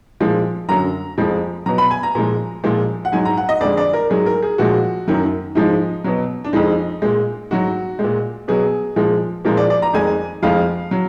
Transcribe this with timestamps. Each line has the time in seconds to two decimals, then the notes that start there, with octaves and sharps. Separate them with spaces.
0.21 A#2 F3 G#3
0.69 F#2 D3 F#3 A#5
1.18 F2 F3 G#3
1.66 B2 F#3 A#5
1.78 B5
1.91 G#5
2.03 A#5
2.15 A#2 F3 G#3 A#5
2.64 A#2 F3 G#3
3.05 F#5
3.12 G#2 F#3 G#5
3.25 A#5
3.37 F#5
3.49 D#5
3.61 F2 D3 G#3 D5
3.77 D5
3.93 A#4
4.10 G#2 F#3 G#4
4.26 A#4
4.42 G#4
4.58 A#2 F3 G#3 F#4
5.08 F#2 D#3 F#3
5.55 G#2 F3 G#3 D#4
6.04 B2 F#3
6.44 D4
6.53 F2 F3 G#3 D#4
7.02 A#2 G#3
7.51 G#2 F#3 F#4
7.99 G#3
8.04 A#2
8.48 B2 F#3 G#4
8.96 A#2 F3 G#3
9.45 A#2 F3 G#3 A#4
9.57 D5
9.70 D5
9.82 A#5
9.93 F2 D#3 G#3 G#5
10.42 F2 F3 G#3 F5
10.91 F#3